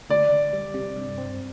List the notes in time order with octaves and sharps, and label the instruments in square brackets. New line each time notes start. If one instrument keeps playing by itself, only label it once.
[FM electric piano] D2 [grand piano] D5
[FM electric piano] D2
G3
C3
G2
C4